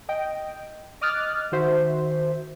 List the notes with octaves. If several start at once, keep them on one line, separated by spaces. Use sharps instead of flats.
D#5 G5
D#5 D6 D#6 F6 F#6 A6
D#3 F#4 C5 E5